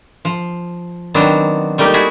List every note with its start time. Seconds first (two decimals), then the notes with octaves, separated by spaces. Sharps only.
0.25 F3
1.14 D#3 F#3 B3 C4 D4
1.78 G3 A3 A#3 D#4 G4
1.94 E4 F#4 G#4 E5